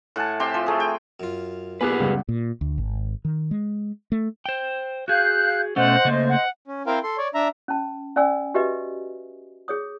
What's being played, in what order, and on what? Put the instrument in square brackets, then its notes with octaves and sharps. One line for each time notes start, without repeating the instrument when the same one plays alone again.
[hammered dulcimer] A2 F#5 G#5 A5
C4 G4 E5 C6
F3
A3 G#4
G5
[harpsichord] F#2 F4
[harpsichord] A#2 [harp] B3 [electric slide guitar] G4 G#4 B4 [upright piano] G#5 D6 F#6
[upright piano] C#2 F#2 [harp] G3
[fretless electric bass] A#2
D2
G#1
D#3
G#3
A3
[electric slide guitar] C5 G5
[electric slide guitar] F#4 G#4 [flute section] F5 G6 [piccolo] F#6
[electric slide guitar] B2 A3 C#4 [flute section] C5 D#5 [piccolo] F#5
[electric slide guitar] C#3 A3 A#3
[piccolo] F#5
[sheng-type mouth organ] C#4
C4 E4 A#4 C5 F5 G5
A4 C6
C#5 D5
D4 E5 A#5
[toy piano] C#4 A5
C#4 D5 G#5 E6
F#4 G4 B4 D#5 E5
G#4 C#5 D#6